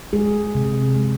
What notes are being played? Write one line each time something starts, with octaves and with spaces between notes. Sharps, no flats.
G#3 G#4
C3
G#3